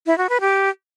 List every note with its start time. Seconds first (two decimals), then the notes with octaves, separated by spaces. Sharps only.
0.07 E4
0.18 F#4
0.29 B4
0.41 G4